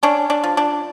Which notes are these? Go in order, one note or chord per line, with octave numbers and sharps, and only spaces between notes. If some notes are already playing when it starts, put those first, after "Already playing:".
C#4 D4
D4
F3
D4